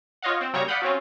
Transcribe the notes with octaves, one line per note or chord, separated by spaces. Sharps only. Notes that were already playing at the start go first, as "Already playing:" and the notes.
F4 C#5 D#5 F5 F#5
C4
C#3 F#3 G3 A#3 C#5 A#5
D5 F5 F#5 B5 D#6 G6
F#3 C4 C#4 F4